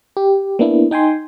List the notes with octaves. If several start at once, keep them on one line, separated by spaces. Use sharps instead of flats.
G4
A#3 B3 D4 E4
D#4 G5 G#5 C6